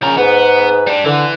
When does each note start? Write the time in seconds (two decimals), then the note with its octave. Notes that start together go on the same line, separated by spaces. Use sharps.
0.02 C#3 F3 C#4 A#4
0.17 G#2 B3 B4
0.87 G3 D4
1.05 D3 E3